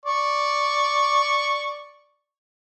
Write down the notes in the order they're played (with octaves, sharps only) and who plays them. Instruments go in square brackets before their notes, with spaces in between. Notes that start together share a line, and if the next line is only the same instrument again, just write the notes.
[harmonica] D5 C#6